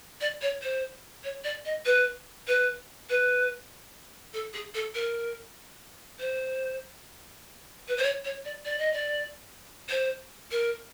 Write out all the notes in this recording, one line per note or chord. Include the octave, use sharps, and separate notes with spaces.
D5
C#5
C5
C#5
D5
D#5
B4
B4
B4
A4
G#4
A4
A#4
C5
B4
C5
C#5
C#5
D5
D5
D#5
D5
C5
A#4